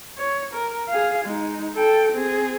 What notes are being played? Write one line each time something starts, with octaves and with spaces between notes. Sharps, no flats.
C#5
A#4
G#4 F5
G#3 D#4
A4 G5
C4 G#4